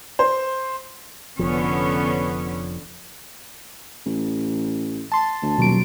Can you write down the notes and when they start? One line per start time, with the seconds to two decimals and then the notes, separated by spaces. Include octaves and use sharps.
0.19 C5
1.39 F1 D3 F3 B3 C#4
4.06 A1
5.12 A5 C6
5.42 D2
5.58 D#1 B2 F#3 D7